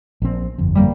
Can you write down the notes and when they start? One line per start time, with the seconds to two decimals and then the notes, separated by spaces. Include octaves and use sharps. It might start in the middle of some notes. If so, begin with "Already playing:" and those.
0.22 A#1 C4
0.58 G1 F2
0.75 G3 A#3